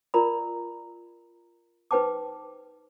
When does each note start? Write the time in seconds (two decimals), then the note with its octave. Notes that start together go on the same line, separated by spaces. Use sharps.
0.14 F4 A#4 D5 A#5 B5
1.91 D#4 B4 C5 G5 A5 D6